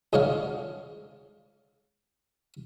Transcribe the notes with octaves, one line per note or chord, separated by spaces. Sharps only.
C#2 G#2 D3 C#5 D#5 F5